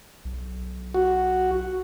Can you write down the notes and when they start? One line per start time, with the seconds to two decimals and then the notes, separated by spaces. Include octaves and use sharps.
0.25 B1
0.94 F#4